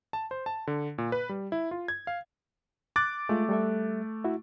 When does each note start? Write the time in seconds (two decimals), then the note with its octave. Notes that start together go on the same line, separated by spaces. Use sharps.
0.13 A5
0.31 C5
0.46 A5
0.67 D3
0.98 A#2
1.12 B4
1.29 G3
1.52 E4
1.71 F4
1.88 G#6
2.07 F5
2.96 D6 F#6 A6
3.29 G#3 A3 F4
3.49 G3 A4 E5
4.24 E4 F#4